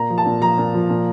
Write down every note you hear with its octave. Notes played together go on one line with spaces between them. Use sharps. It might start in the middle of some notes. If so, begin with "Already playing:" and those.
Already playing: A#2 A#5
F3
A5
A#2
F3 A#5
A#2
F3
A#2